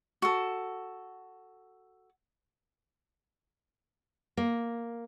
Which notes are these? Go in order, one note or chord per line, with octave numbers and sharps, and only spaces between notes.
F#4 A4
A#3